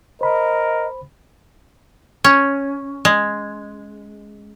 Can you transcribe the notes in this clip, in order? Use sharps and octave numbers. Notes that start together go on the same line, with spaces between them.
A#4 C5 D#5 B5
C#4
G#3